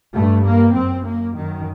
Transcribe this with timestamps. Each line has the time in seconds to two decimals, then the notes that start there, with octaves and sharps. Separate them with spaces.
0.14 G2 A3
0.44 A#3
0.74 F#2 C4
1.05 A#3
1.36 F#2 D#3